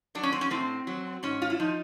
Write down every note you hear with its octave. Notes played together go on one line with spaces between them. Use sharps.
F#3 D4
C#4
C4
C#4
A2 C4
F#3
G#2 C#4
F4
E4
F3 D#4